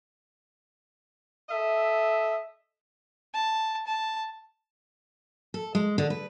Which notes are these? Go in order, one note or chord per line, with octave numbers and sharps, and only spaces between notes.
A4 D#5 E5
A5
A5
A4
G#3
D3
B4